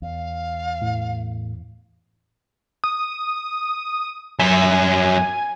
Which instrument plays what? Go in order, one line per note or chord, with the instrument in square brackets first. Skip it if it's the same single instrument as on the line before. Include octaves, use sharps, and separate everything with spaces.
[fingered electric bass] E2 [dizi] F5
[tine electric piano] A2
[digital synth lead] D#6
[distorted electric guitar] F#2 E5 [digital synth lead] G#5